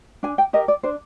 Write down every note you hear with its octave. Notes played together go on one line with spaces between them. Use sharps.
D4 G#5
G5
G4 A#4 D#5
D5
D4 C5